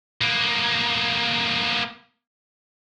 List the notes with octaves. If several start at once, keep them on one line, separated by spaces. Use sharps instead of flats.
A#3 B3